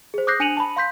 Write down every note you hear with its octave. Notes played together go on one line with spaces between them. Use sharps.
G#4 C5
D6 D#6 F#6 G6 A#6 C7
D4 G#5 C#7 D#7 F7 F#7
A5 B5
F5 C6 G6 B6